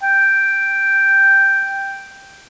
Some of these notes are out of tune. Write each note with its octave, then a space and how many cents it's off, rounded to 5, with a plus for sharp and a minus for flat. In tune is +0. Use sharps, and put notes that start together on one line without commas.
G5 +0